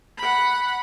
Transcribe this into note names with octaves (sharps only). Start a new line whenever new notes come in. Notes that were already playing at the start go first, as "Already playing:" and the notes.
F#5 B5